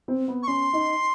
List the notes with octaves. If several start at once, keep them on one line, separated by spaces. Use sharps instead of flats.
C4
B3
C#6
C#4 C6
D#4